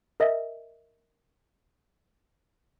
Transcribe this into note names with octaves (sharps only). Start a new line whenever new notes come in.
A#4 D#5 E5